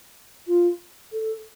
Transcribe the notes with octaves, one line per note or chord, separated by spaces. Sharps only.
F4
A4